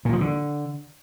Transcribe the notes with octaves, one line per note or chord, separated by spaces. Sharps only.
A#2
F3
D3